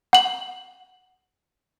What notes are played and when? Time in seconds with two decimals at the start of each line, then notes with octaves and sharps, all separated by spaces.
0.13 F#5 F#7